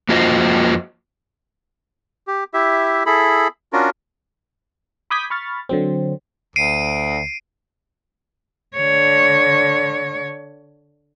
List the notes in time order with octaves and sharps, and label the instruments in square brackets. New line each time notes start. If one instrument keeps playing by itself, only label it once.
[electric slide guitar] F2 A#3 F4 F#4 C5 D#5
[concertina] G4
E4 G4 E5
E4 G#4 A4 B5
C#4 D4 F4 F#4 A#4
[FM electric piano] B5 D6 D#6 G6 G#6 B6
B5 C#6 F6 A6
D3 F#3 C4
[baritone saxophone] D2 [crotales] C7 D7 D#7
[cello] D3 C#5